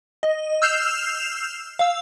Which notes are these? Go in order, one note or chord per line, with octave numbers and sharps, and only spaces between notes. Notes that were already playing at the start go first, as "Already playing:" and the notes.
D#5
E6 F6 G6 C7 E7 F7
F5 E6